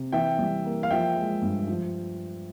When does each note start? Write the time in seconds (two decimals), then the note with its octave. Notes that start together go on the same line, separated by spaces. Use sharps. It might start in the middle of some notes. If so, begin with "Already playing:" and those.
Already playing: C3
0.12 E3 E5 G5
0.39 G3
0.65 A#3
0.83 F5
0.91 F3 E5 G5
1.16 G#3
1.42 G2
1.67 F3